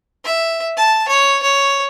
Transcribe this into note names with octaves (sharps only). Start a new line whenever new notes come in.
E5
A5
C#5
C#5